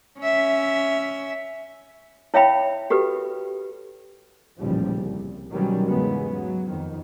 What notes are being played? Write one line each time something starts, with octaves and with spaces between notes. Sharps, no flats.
C#4 E5
E4 C#5 E5 F5 G5 B5
F#4 G4 A4 B4
A1 D#2 A#2 C#3 F3 G3
C2
B2 D#3 F#3 G3 C#4
E2 G#2 C#3 F#3 G#3 B3
F#3
F2 D#3